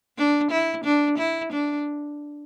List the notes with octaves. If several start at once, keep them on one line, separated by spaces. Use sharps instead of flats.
D4
E4
D4
E4
D4